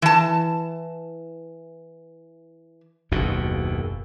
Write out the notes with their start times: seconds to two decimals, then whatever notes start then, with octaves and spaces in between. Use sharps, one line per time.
0.02 E3 A5
3.11 F#1 D#2 B2